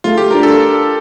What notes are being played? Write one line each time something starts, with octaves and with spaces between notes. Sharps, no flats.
A3 F4
G4
D4 F4 A#4
A4